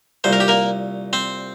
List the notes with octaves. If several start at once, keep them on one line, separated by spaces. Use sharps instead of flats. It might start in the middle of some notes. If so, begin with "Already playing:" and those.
C2 A#2 C5
A#4
G4
A#3 A#4
C4 C5